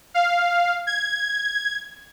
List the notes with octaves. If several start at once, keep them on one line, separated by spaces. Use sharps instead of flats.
F5
G#6